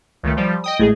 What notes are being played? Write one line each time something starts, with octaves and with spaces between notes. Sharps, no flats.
C#2 D#3 A3
F3 G3
D#5 G5 D#6
A1 A2 G#3 G#4